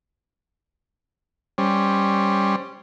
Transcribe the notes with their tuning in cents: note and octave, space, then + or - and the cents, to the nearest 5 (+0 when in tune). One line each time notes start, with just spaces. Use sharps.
G3 +5 C#4 +5 C5 +0